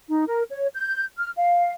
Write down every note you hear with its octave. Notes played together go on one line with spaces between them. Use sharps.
D#4
A#4
C#5
G6
F6
F5